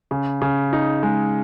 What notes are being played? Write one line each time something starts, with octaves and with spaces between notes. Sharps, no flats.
C#3
C#3
D#4
G#3